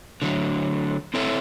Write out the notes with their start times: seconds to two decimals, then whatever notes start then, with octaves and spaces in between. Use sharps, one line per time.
0.22 D3 F#3 A3
1.14 C4 E4 A4 C#5 E5